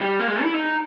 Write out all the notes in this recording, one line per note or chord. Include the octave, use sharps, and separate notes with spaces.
G3
A#3
G#3
E4
D#4